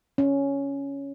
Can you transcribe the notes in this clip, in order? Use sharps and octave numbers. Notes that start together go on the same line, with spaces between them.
C#4